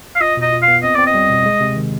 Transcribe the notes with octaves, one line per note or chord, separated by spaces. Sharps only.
F5
F4 D#5
B2 D#5
F4
F5
B3
C4 D#5
C4 D5
D#5
G3
B2
G#3
C3
D#3